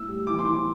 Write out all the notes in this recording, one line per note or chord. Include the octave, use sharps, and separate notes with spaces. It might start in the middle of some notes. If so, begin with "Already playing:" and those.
Already playing: A2 E6
G3
E3 D6
C6
E3 D6